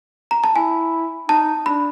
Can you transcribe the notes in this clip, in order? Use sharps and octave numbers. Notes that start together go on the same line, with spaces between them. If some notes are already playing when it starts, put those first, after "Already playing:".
A#5
A5
E4 G#5
D#4 A5
D4 B5